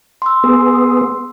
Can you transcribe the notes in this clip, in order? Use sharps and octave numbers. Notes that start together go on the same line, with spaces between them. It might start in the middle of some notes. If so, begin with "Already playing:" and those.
C6 E6
B3 G#4